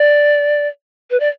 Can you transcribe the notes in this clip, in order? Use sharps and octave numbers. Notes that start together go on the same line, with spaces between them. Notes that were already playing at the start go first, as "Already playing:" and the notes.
Already playing: D5
B4
D5